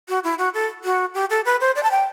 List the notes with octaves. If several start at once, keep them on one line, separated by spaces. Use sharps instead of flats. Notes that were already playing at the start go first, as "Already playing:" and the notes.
F#4
E4
F#4
A4
F#4
G4
A4
B4
C5
D5
A5
G5